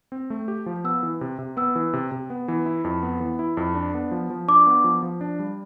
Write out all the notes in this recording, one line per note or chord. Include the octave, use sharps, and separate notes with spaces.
C4
A3
G4
F3
B3 E6
E3
C3
C3
B3 E6
E3
C3
C3
B3
E3
E4
F2
B3
E3
E4
F2
D4
B3
F3
F3
D4 D6
B3
F3
F3
D4
G3